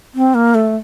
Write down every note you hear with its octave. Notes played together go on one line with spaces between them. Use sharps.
C4
A#3
A3